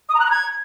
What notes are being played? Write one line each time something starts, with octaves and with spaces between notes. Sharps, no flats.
D#6
A#5
F#6
A#5
G#6